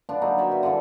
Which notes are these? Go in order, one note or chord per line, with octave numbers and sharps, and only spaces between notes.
F3 B3 D4
F#3 A#3 D#4
C#5 D5 E5 G5
F#4 B4
D3 E3 F3 G3